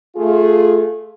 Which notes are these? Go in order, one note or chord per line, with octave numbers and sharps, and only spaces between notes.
A3 F4 G#4